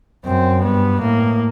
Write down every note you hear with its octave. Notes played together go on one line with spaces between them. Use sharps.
F#2 C4
G2 B3
A2 A#3